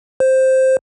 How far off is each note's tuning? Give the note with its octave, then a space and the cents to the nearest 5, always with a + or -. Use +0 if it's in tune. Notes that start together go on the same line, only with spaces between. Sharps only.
C5 +5